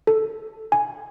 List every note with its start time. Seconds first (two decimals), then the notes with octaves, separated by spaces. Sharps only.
0.07 A4
0.72 G#5